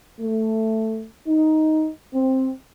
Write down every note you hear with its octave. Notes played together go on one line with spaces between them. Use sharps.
A3
D#4
C4